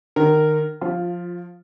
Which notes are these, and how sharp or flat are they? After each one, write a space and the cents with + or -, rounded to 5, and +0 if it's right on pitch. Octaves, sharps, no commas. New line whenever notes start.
D#3 -30 A#4 -10
F3 +15 F4 +0